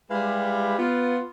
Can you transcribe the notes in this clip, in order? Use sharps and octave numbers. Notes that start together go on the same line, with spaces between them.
G3 G#3 E4 G4 B4 F5
B3 F4